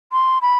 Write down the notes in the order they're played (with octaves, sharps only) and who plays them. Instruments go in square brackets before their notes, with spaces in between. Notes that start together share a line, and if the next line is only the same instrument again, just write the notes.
[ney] C6
B5